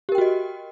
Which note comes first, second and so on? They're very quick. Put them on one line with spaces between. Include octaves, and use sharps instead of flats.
G4 A#4 G5 F#4 D#5